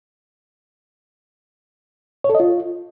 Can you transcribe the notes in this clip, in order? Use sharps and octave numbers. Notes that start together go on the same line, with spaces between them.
C#5
A4
D#5
F4